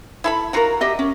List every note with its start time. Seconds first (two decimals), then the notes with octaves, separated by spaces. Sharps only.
0.24 E4 A4 B5
0.53 D#4 F4 F#4 A#4 F#5
0.81 G4 D#5 E5
0.99 C#4